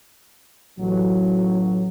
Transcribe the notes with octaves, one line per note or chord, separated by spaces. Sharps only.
A1 F#3